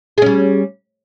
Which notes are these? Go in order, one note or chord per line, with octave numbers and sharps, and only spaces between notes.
G3 C#4 G#4